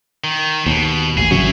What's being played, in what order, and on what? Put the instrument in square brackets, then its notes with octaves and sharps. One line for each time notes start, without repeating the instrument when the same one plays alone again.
[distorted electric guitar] D#3
[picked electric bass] D#2 [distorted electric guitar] B2
[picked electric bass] A1 [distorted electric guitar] G#4
[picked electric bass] G#1 C#3 F#3 [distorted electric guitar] E4 C#5